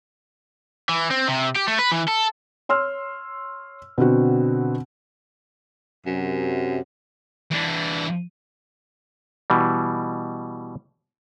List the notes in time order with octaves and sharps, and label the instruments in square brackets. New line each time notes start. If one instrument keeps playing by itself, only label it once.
[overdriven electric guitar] E3
C4
C3
G4
A3
B4
E3
A4
[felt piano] C#5 C6 E6 F6
B2 D3 C4 F#4
[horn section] F#2 C3
[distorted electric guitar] E3 D4
[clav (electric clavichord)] B2 E3 G3